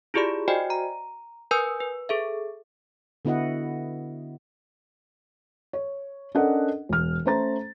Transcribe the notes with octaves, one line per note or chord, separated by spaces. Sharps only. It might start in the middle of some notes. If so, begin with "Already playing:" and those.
E4 F4 G4 G#4 D5 B5
F#4 C5 D5 D#5 G5 G#5
A#5
A#4 B4 G#5 D#6 E6 G6
B4
G#4 A4 E5
D3 B3 E4 F#4 D#5 F#5
C#5
C#4 D4 A4 A#4 D#5 F#5
E1 F6
A3 C#4 C5 A#5 A6